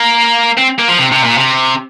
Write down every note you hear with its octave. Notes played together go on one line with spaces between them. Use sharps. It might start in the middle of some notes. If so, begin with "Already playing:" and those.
Already playing: A#3
C4
A#3
F3
C3
C3
A#2
C3